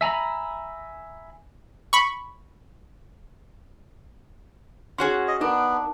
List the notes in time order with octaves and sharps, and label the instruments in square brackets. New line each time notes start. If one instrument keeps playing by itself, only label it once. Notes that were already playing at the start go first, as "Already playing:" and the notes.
[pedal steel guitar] E5 G#5 A#5 B5
[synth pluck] B5 C#6
[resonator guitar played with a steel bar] C#4 F#4 G#4 [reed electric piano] C#5 C6
[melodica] D#5
[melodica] B3 [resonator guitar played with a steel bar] D4 [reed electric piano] D#4 A#4